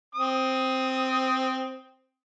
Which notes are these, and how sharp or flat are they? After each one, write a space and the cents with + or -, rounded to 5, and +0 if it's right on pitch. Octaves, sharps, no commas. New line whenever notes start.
C4 +0 D#6 +15